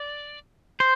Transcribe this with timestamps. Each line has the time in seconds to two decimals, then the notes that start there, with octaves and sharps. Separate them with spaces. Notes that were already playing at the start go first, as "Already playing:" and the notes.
Already playing: D5
0.80 C5